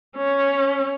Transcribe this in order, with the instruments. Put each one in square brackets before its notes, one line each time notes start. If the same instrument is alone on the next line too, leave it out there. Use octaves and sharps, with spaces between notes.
[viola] C#4